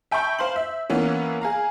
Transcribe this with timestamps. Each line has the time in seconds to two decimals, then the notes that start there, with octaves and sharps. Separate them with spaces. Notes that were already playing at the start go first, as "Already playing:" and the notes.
0.11 E5 G5 A5 B5 C#6 G6
0.39 C5 F5 C6 F#7
0.56 E5
0.90 E3 A#3 B3 C#4
1.41 G#4 F5 A#5